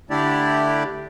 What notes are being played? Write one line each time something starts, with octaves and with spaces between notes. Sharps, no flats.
D3 A3 D4 E4 G4 D5